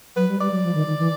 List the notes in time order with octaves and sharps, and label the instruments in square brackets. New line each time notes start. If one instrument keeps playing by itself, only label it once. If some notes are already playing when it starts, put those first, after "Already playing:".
[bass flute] F#3 [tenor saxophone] B4
[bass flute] G3
[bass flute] G3 [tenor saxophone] D5
[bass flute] F#3
F3
D#3
D#3
E3